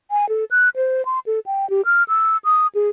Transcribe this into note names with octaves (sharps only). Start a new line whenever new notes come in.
G#5
A4
F#6
C5
C6
A4
G5
G4
F6
E6
D#6
G#4